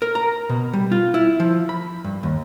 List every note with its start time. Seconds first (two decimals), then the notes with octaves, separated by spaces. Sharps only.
0.02 A#4
0.15 A#5
0.49 B2
0.73 G3
0.92 F4
1.14 E4
1.40 F3
1.69 B5
2.04 G2
2.23 D#2